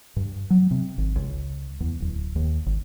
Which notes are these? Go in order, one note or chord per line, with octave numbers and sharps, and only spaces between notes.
G2
F#3
C3
G#1
C#2
E2
D1
D#2
G#1